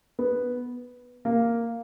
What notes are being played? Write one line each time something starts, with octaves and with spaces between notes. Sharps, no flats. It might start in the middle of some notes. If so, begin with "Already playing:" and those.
B3
A#3